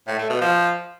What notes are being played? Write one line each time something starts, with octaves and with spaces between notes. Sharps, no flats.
A2
A3
B2
F3